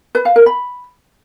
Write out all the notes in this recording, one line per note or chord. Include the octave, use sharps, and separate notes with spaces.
B4
F5
A#4
B5